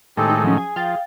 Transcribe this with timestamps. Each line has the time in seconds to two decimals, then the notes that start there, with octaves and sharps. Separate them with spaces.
0.17 A2 D#3 G#3 C4 G4 A4
0.30 D#4
0.44 F3 F#3 C#4
0.58 G#4 G#5
0.76 F3 F5 G5 A6